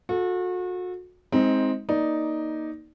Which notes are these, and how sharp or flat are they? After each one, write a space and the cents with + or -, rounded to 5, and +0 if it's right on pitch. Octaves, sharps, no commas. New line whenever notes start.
F#4 -35 A4 +0
G#3 +0 C4 +5 D#4 +25
A#3 +20 D#4 +5 D5 +0